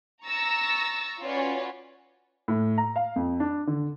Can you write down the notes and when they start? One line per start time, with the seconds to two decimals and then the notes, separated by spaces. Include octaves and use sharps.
0.24 A#5 C#6 E6 A6 A#6
1.20 C#4 F4 F#4 B4 C#5 D5
2.48 A2
2.78 A#5
2.96 F5
3.16 F2
3.40 D4
3.67 D3